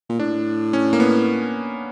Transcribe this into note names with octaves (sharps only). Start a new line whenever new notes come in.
A#2
A2 D4
C#4
A#3
B3